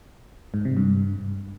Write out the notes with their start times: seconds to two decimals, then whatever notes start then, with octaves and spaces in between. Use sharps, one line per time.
0.54 G#2
0.65 C3
0.77 G2